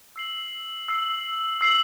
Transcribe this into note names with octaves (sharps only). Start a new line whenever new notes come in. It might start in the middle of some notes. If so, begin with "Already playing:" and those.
E6 C7 F#7
E6 C7 F#7
E6 C7 F#7